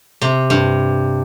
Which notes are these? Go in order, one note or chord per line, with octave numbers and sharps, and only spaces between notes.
C3
G2